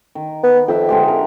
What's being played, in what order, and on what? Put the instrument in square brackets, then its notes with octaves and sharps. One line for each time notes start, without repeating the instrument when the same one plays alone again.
[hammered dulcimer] D#3
[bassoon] B3
[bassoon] F2 [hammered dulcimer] E5 G5
[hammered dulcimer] D3 G#3 G4
A#4